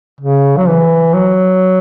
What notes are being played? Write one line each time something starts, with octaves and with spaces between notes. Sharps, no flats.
C#3
F#3
E3
F#3